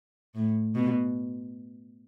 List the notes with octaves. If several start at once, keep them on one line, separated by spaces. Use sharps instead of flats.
A2
B2